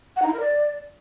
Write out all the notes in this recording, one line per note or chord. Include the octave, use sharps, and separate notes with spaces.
F#5
D#4
E4
A#4
D5